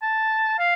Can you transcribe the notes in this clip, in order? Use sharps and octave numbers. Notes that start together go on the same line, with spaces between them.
A5
F5